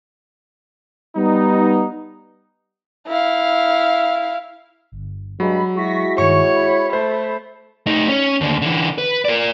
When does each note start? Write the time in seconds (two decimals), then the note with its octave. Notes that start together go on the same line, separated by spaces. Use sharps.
1.17 G3 B3 D#4
3.07 E4 F5
4.92 G1
5.40 G2 F#3 G#3 B5
5.77 G#3 E4 F#4 C#6 A#6 B6
6.18 G2 D#3 C#5 C#6
6.55 B5
6.93 A3 C5
7.87 A3 D#4
8.09 C#4
8.41 D#2 D3
8.62 D3 E3
8.98 B4
9.25 A#4 D5